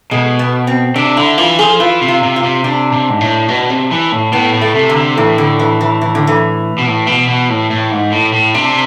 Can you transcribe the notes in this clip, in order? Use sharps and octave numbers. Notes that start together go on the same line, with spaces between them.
B2 G#3
B3
C4
C3 D4
D3 E4
E3 F4
F3 G#4
E3 F4
C3
F4
C3
F4
C3
C3 D4
C3
G#2
A2
B2
C3
E3
A2
A2 B3
A2
A3
C3
D3
C3
A2 E3
D3
E3
E3
E3
D3
E3
B2
A2
B2
B2
A2
A2
G#2
A2
A2
C3 D4